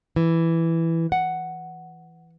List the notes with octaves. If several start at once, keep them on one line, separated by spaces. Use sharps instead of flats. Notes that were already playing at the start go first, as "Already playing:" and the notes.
E3
F#5